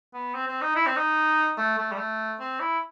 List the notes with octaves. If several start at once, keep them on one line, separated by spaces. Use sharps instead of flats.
B3
C4
C4
D#4
E4
C4
D#4
A3
A3
G3
A3
C4
E4